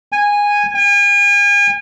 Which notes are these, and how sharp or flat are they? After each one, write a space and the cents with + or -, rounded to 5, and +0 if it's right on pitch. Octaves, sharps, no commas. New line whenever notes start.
G#5 -10
G#5 -40